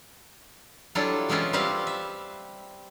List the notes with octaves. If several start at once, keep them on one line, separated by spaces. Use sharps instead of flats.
F#3 G3 D4 E4 F4 A4
E3 G#3 B3 C#4 E4 F4
G3 C4 G4 B4 C5 F5
E5